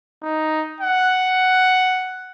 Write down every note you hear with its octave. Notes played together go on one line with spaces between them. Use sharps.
D#4
F#5